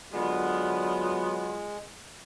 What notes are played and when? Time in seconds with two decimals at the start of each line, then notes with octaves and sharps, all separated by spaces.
0.13 D3 F#3 G#3 B3 F4